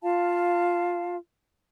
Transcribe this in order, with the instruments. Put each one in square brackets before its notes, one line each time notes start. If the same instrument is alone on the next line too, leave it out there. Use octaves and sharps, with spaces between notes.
[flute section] F4 F5 A5